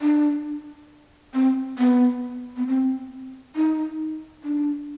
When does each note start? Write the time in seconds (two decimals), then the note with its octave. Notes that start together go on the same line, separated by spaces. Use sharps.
0.02 D4
1.34 C4
1.78 B3
2.57 B3
2.67 C4
3.56 D#4
4.44 D4